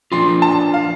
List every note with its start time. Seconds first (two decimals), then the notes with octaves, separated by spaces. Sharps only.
0.12 F3 D4 F4 C6
0.42 A5
0.74 F5